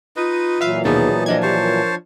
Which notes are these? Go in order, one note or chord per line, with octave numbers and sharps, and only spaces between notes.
D#4 F4 B4 D#5
A#2 E3 F#3 B4 E5 F5
D#2 B2 B3 D#4 G#4 A5
F3 D4 D#5 G#6
G4 C5 C#5 A5
A#4